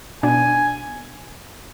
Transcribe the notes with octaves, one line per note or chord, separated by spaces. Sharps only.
B2 B3 D4 G#5